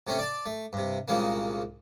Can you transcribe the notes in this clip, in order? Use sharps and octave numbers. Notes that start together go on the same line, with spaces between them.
C3 A3 C4 C#4
D5 A5
A3
G2 C3
C2 A#2 C#3 G#3 A#3